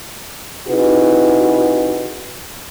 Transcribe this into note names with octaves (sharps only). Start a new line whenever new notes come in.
C3 D#4 E4 F#4 G#4 B4